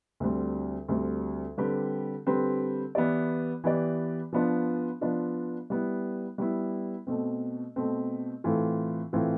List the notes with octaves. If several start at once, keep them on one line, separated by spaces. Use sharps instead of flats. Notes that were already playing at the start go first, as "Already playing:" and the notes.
D2 D3 G3 C4
D2 D3 G3 C4
D3 G3 C4 G4 B4
D3 G3 C4 G4 B4
E3 B3 E4 G4 D5
E3 B3 E4 G4 D5
F3 B3 D4 F4
F3 B3 D4 F4
G3 B3 E4
G3 B3 E4
B2 A3 C4
B2 A3 C4
A2 E3 A3 C4 F4
A2 E3 A3 C4 F4